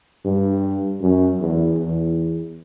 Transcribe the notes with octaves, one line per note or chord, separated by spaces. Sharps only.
G2
F#2
E2
E2